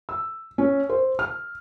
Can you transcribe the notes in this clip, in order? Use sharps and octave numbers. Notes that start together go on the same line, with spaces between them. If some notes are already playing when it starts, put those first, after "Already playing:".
E6
C#4
C5
F6